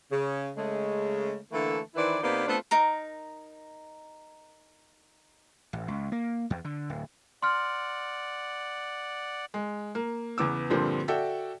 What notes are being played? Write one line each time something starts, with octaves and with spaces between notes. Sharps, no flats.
C#3
C#3 G#3 A3
D3 E3 A3 A#3 A4
D#3 E3 E4 B4 C5 D5
C3 A#3 B3 D#4 B4 D5
A3 B3 C4 D4 F4 A4
D#4 A#4 A#5
A1
C#2
A#3
E2
D3
D1
D5 F#5 C6 F6
G#3
A#3
E2 C#3 B3 D6 E6
G2 A#2 D3 F3 G3 C4
F#4 A4 D5 E5 G5